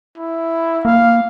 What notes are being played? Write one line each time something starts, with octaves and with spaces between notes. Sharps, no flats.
E4
A#3 F5